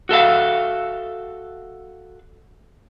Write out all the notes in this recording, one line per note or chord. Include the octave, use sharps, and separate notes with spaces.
F#4 A4 E5 F5